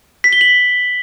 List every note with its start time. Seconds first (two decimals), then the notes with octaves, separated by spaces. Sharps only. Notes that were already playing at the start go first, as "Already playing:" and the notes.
0.24 B6
0.33 G7
0.41 F#7